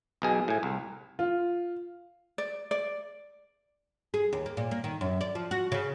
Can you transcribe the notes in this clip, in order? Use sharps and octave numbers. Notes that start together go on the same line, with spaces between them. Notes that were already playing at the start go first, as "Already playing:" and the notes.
B1 B2 G#4
A2 G#5
C2
F4
D5
D5
G#4
D#2
A#3
A#2
A#3
D#3
F#2
D5
F3
F#4
C#3